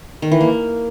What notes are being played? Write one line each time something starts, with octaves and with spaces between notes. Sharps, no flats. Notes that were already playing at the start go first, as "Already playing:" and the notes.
D#3
E3
A#3